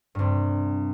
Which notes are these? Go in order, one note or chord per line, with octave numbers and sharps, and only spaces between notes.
C2 G2